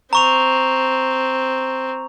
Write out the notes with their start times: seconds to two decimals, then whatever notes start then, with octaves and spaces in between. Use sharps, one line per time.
0.13 C4 A#5 C#6 F7